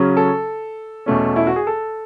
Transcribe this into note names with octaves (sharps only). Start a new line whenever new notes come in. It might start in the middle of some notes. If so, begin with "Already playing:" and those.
Already playing: C#3 F#3 C#4
A4
E2 B2 A3 C#4
E4
F#4
G#4
A4